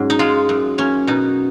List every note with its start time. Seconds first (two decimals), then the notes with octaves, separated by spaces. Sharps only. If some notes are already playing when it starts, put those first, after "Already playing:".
Already playing: G#2 F#3 C#4
0.10 D#4
0.19 G#3 F4
0.49 F#2
0.78 A#3 C#4
1.07 B2 D#4